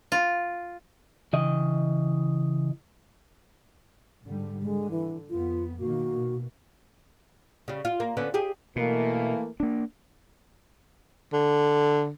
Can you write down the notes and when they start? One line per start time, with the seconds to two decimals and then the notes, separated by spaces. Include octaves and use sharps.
0.12 F4
1.33 C#3 E3 D#5
4.24 G#2 D3 G3
4.62 D3 G#3
4.91 E3
5.30 F2 B3 F4
5.80 B2 D#3 A#3 F#4
6.16 B2
7.68 C#3 G3
7.85 F4
8.00 A#3
8.17 D3 B3 C#4
8.34 G4 G#4
8.76 B2 E3 A3 A#3
9.60 A#3 D4
11.33 D3